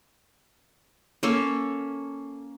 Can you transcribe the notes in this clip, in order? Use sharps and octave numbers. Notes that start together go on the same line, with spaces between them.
A#3 C#4 A4